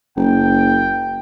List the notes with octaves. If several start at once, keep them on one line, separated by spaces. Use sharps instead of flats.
F#1 G5